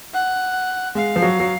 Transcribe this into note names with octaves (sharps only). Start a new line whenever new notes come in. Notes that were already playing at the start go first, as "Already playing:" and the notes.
F#5
G#3 F5
F3
F#3
F#3